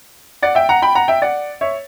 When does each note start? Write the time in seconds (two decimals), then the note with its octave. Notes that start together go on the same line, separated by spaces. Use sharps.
0.42 D5 F#5
0.55 E5 G5
0.69 F#5 A#5
0.82 G5 B5
0.95 F#5 A#5
1.08 E5 G5
1.22 D5 F#5
1.61 C#5 E5